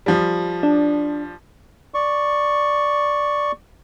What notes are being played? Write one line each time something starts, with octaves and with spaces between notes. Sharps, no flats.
F3 G3
D4
D5 C#6